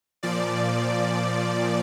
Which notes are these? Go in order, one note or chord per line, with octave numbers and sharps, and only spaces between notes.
A#2 F3 D5